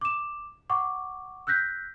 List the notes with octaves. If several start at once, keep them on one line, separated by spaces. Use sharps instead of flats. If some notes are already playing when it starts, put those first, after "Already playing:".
D6 E7
F#5 C#6 D6
E6 F#6 G6 A#6 B6